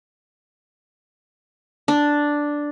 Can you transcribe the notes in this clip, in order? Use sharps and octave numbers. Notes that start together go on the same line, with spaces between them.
D4